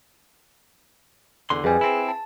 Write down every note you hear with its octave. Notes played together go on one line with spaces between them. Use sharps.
E2 D3 C6
F2 G3 G#4 B4 G#5
C4 E4
A5